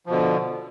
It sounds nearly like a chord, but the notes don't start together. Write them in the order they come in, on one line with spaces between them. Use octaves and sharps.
F3 B2 D3